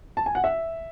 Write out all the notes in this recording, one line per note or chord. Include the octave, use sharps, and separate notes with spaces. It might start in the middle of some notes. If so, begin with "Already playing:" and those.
A5
G#5
F#5
E5